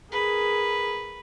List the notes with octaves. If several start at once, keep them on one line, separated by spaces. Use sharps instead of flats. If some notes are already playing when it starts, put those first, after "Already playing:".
G#4 A#4 B4